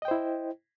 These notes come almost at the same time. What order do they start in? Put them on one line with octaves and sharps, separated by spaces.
D#5 G5 C5 E4